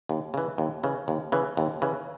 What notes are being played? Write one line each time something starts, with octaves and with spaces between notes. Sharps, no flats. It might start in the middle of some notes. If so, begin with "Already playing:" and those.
D#2
C#3 E3
D#2
C#3 E3
D#2
C#3 E3
D#2
C#3 E3